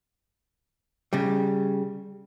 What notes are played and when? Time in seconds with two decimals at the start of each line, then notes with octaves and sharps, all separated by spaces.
1.13 C#3 G3